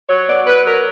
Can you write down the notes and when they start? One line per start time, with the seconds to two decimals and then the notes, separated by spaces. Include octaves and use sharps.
0.09 F#3 C#5
0.28 B3 D5
0.46 B3 B4
0.65 F#3 A#4